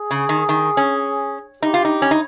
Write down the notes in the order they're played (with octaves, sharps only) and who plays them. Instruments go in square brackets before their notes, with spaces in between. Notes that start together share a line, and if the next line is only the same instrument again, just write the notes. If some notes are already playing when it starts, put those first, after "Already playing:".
Already playing: [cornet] G#4
[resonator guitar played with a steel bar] C#3
D#3
D#3
C#4
[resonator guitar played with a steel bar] D#4 [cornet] G4
[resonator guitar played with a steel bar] F4
D#4
C#4
D#4